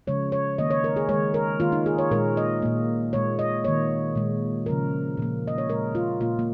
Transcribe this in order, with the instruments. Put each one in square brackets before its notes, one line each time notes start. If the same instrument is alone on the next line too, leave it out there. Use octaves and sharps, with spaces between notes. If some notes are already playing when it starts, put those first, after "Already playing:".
[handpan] C#3 F3 G#3 C#5
C#5
D#3 A#3 D#5
C#5
A#4
G#4
G#3 C#5
D#3
A#4
D#3 A#3 F4
D#4
G#4
C#5
A#2 G#3 A#4
D#5
A#2 A#3
A#2 G#3 C#5
D#5
D#3 A#3 C#5
A#2 G#3
C#3 F3 A#3 A#4
A#2 F3 A#3
D#5
C#5
A#2 G#3 A#4
F4
A#2 A#3 F4
A#3